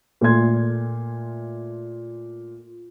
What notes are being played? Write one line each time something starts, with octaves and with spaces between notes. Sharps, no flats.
A#2 A3 C6 G#6